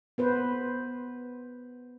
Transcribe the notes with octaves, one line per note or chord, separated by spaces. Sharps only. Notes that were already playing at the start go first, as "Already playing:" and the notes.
B3 B4 C5